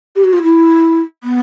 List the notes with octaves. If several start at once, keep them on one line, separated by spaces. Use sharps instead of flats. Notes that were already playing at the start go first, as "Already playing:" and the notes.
G4
F#4
F4
E4
B3